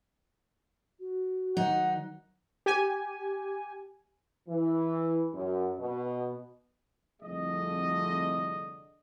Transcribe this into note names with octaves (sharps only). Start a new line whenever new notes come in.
F#4
D#3 F#3 D#4 F#5
G4 G#5
E3
F#2
B2
C2 F2 D3 A3 G#4 D#5